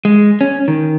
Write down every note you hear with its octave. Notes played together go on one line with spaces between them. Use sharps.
G#3
C#4
D#3